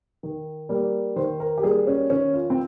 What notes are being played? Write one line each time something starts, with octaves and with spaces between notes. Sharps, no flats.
D#3
G3 A#3
D#3 C5
A#4
G4
G3 A#3 G#4
C#4
D#3 C#4
F4
C4